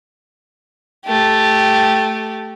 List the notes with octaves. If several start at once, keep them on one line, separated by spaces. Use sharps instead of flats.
A3 G4